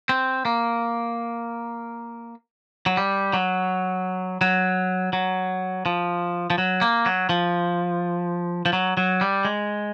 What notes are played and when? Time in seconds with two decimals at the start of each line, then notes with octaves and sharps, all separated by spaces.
0.09 C4
0.45 A#3
2.86 F#3
2.97 G3
3.33 F#3
4.41 F#3
5.13 F#3
5.86 F3
6.50 F3
6.58 F#3
6.81 A#3
7.06 F#3
7.29 F3
8.66 F3
8.73 F#3
8.97 F#3
9.21 G3
9.45 G#3